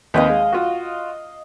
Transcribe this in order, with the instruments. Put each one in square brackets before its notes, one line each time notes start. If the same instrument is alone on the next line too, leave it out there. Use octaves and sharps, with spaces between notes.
[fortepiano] D#2 C4 B4 [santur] D#5 F5 D#6
[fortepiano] G#3
F4 F#4